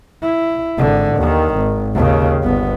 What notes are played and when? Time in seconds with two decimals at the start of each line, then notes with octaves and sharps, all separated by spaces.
0.22 E4
0.78 G#1 D3
1.17 D#2 D#3
1.55 G#1
1.94 D#2 C#3
2.43 G1 B3